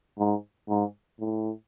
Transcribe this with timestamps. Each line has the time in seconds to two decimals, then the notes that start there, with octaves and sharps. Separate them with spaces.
0.19 G#2
0.69 G#2
1.20 A2